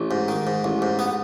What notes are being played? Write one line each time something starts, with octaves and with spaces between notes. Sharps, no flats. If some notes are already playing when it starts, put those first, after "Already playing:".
Already playing: A1
G#2
D#3
G#2
A1
G#2
B3